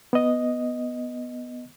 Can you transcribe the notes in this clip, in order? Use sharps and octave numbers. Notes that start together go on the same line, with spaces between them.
B3 D#5